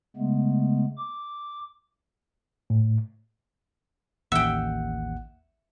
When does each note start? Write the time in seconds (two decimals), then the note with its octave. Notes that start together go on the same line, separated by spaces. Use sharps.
0.17 C#3 G#3 A3 B3
0.98 D6
2.70 A2
4.32 A1 D#2 E5 F#5 G5